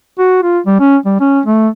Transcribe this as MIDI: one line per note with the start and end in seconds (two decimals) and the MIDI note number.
0.19 0.38 66
0.43 0.59 65
0.66 0.76 55
0.80 0.96 61
1.06 1.15 55
1.20 1.40 61
1.46 1.68 57